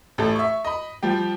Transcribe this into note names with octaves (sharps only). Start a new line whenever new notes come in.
A1 A3 A4
E5 C#6
D#5 B5
F3 G3 G4